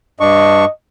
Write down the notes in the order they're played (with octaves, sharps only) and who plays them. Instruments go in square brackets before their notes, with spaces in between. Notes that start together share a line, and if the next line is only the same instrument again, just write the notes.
[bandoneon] G2 D4 C#6 [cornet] D#5